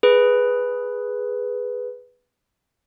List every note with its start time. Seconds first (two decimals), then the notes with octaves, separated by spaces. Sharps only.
0.03 G#4 B4